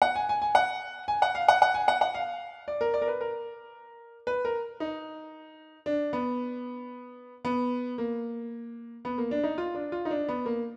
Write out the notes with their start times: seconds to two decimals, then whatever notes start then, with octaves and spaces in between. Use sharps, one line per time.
0.02 F#5
0.16 G#5
0.29 G#5
0.42 G#5
0.55 F#5
1.08 G#5
1.22 F#5
1.35 F5
1.48 F#5
1.62 F#5
1.74 G#5
1.88 F#5
2.01 F#5
2.15 F5
2.68 D5
2.81 A#4
2.94 D5
3.02 A#4
3.08 B4
3.21 A#4
4.27 B4
4.45 A#4
4.80 D#4
5.86 D4
6.13 B3
7.45 B3
7.98 A#3
9.05 B3
9.18 A#3
9.31 D4
9.44 D#4
9.58 F4
9.75 D4
9.92 F4
10.05 D#4
10.11 D4
10.28 B3
10.46 A#3